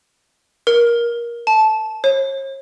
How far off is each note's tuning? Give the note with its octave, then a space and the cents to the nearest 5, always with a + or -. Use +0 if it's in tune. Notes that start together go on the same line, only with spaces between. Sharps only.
A#4 +20
A5 -15
C#5 -40